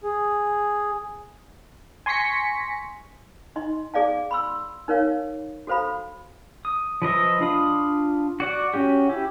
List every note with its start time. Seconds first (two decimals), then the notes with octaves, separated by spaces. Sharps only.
0.03 G#4
2.06 G#5 C6 C#6 A#6 B6 C#7
3.56 D#4 D#5 C6
3.94 G#4 D5 F5 A5
4.31 B5 C6 E6
4.88 D#4 A#4 C#5 F5
5.67 F#4 A4 C5 F5 B5
6.65 D#6
7.02 F3 B4 D#5 E5
7.41 D4 F4 B5 D#6
8.40 F#4 D5 F#5
8.74 C#4 F#4 G4
9.09 E4 G4